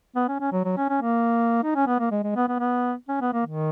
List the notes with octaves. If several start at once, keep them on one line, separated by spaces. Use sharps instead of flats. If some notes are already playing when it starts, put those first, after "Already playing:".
B3
C#4
C#4
F#3
F#3
C#4
C#4
A#3
D#4
C#4
B3
A#3
G#3
G#3
B3
B3
B3
C#4
B3
A#3
D#3